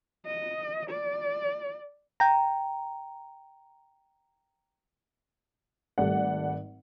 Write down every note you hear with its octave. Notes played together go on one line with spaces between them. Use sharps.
D#5
D5
G5 A#5
G#1 G3 A3 D5 F#5